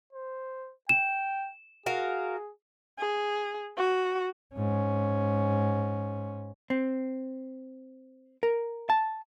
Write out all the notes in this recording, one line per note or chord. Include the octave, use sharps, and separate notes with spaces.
C5
G5 E7
F#4 G#4 A#4 F5
G#4
F#4
G#2 C#4
C4
A#4
A5